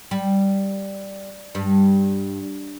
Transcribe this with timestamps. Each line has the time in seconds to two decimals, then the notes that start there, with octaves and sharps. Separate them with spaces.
0.11 G3
1.55 G2